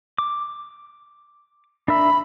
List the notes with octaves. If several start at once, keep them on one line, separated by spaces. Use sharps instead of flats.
D6
D4 A#4 E5 B5